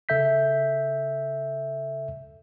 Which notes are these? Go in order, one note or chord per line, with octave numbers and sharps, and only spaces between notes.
C#3 A4 E5 G6 B6